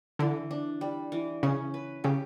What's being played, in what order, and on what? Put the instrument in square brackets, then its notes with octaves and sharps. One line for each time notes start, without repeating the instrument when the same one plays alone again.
[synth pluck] D3 [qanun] E3
[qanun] D4
G3
E3
[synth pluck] C#3 [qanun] C#4
[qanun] B4
[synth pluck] C#3 [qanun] G4